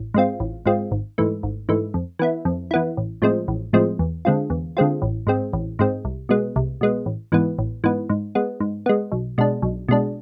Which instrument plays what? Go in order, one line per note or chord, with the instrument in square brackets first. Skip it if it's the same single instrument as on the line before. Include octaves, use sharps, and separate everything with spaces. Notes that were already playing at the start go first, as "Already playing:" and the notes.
Already playing: [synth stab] A1
G#2 G#3 C4 F4
A1
G#2 G#3 C4 F4
G#1
G#2 E3 A3
G#1
G#2 E3 A3
F2
E3 B3 E4
F2
E3 B3 E4
A1
A2 F3 G#3 C4
A1
A2 F3 G#3 C4
E2
D3 G#3 C4 F4
E2
D3 G#3 C4 F4
A1
G#2 G#3 C4
A1
G#2 G#3 C4
C2
B2 G#3 B3
C2
B2 G#3 B3
A1
G#2 E3 B3
A1
G#2 E3 B3
G#2
G#3 B3
G#2
G#3 B3
B1
B2 G#3 D4
B1
B2 G#3 D4